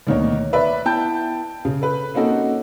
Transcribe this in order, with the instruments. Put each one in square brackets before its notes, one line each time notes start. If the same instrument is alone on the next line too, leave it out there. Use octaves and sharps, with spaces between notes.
[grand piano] D2 B2 D#3 A#3 D#4 C#5
B4 D5 E5
B3 E4 G5 A5 G6
C#3
A4 B4
A#3 C4 C#4 D#4 F#4 A4